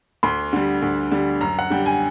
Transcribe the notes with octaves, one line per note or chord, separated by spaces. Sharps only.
D2 C6
D3 G3
D2
D3 G3
F#2 A#5
F#5
D3 G3 G5
G#5